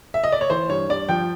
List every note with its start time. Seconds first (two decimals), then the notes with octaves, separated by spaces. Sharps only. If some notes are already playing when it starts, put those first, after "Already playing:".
0.14 E5
0.24 D#5
0.32 D5
0.41 C#5
0.50 E3 C5
0.69 G2 C#5
0.89 G2 D5
1.09 F3 G5